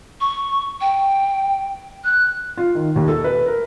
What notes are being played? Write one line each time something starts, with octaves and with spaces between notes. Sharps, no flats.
C#6
G5
F#6
F4
D#3
D#2
A4
B4
A#4